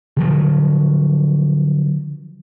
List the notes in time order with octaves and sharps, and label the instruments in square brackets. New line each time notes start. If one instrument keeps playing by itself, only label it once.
[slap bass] D3 F3 F#3